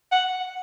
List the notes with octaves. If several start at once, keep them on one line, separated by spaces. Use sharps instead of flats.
F#5